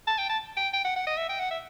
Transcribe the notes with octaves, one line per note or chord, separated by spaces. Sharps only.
A5
G5
A5
G5
G5
F#5
F#5
D#5
E5
G5
F#5
E5